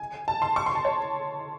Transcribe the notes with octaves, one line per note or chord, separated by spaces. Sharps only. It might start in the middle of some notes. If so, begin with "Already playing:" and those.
Already playing: G#5
A5
C6
C#6
C6
A5
C#5